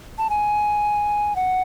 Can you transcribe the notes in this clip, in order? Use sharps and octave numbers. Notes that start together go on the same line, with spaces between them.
A5
G#5
F#5